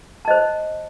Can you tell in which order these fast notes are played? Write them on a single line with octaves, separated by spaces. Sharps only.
A5 D#5 C5